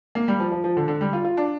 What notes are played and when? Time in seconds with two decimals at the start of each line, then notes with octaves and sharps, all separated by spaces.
0.15 A#3
0.28 G3
0.40 F3
0.52 F3
0.64 F3
0.77 D3
0.88 D3
1.01 G3
1.13 F4
1.25 F4
1.37 D4